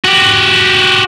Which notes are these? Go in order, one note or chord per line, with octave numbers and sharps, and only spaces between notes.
F#4 G4